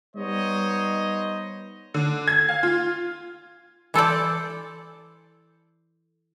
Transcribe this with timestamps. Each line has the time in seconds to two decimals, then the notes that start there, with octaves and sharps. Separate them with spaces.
0.16 G3 B3 D#4 C5 C#5 D#5
1.94 D3
2.28 G#6
2.49 F5
2.63 F4
3.94 E3 A4 C5 D5